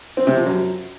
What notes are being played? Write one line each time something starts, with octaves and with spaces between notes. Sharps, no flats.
C4
C3
F3
F#2